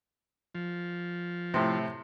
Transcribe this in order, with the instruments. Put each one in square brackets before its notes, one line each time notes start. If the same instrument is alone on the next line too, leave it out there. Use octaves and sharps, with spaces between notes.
[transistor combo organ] F3
[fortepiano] A2 C3